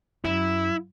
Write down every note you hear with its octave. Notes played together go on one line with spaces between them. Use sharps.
F#2 E4